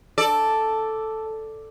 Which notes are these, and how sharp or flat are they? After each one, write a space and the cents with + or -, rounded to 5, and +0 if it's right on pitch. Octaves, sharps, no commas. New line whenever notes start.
A4 +0 D5 +0